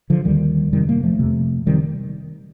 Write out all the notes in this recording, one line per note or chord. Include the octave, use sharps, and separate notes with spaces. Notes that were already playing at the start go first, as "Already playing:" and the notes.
D3 F3
D#2 D3 D#3 G3
F2 C3 D#3 G3
G3 A#3
F3 A3
F2 C3
C3 D#3 G3